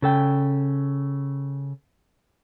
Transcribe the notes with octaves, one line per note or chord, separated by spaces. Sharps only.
C#3 A4 G5